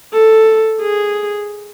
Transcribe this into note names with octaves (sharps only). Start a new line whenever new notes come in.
A4
G#4